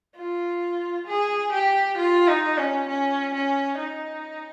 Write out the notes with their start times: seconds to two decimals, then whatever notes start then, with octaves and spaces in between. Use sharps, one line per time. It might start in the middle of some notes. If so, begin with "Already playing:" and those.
0.16 F4
1.07 G#4
1.52 G4
1.98 F4
2.27 D#4
2.58 C#4
2.89 C#4
3.34 C#4
3.79 D#4